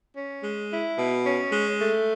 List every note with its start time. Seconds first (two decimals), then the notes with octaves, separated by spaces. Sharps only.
0.15 C#4
0.43 G#3
0.70 E4
0.97 B2
1.24 C#4
1.52 G#3
1.79 A3